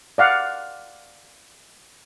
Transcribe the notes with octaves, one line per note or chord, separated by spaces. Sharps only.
D5 F5 F#5